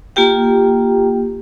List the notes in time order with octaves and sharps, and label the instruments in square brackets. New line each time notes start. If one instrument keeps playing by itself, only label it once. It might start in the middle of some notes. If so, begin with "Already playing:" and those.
[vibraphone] A#3 F4 G4 G5